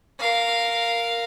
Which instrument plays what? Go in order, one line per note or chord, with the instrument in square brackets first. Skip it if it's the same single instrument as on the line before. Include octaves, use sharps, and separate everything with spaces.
[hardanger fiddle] A#4 F5